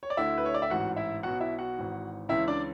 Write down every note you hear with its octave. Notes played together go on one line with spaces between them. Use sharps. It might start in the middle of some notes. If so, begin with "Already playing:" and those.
C#5
D5
D2 D3 E4 E5
B4
C#5
D5
E5
A1 G#2 E3 F#4 F#5
E4 E5
B1 B2 F#4 F#5
E4 E5
F#4 F#5
G#1 G#2 E3
C#2 C#3 E3 E4 E5
D4 D5